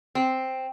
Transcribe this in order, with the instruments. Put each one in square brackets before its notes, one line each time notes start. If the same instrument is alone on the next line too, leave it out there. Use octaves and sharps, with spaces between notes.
[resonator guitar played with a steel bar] C4